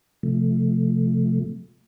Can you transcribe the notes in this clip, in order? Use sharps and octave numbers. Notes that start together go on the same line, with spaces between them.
C3 F3 A3